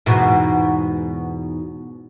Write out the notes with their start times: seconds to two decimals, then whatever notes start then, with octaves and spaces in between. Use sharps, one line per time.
0.06 E2 G#2 B2